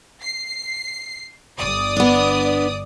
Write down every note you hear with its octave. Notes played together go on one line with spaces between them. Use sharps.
C7
G1 D5 D#6
B3 D4